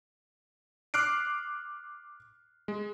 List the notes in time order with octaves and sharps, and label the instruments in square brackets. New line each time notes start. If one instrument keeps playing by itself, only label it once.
[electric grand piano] D6 F6 F#6 C7 D7
G#3